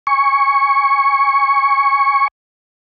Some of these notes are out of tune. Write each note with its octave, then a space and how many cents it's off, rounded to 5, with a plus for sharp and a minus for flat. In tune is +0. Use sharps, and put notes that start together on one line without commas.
G#5 -15 C#6 +0